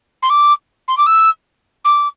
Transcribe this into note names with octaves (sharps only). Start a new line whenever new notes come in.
C6
D6
C6
D6
E6
D6